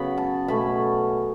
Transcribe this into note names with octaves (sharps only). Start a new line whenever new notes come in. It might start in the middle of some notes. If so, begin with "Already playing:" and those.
Already playing: C#3 F#3 B3 B5
A5
B2 A3 C#4 B5